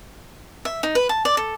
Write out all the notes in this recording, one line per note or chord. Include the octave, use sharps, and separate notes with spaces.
E5
D#4
B4
A5
D5
A4